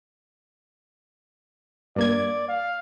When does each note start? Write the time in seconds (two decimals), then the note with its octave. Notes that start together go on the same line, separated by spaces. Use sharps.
1.96 G2 A#3 D5 G#6
2.48 F5